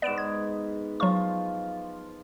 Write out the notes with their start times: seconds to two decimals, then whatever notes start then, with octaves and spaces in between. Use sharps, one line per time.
0.02 G#2 B3 D5 D7 E7
0.18 G#6
1.00 F3 F#3 F4 C#6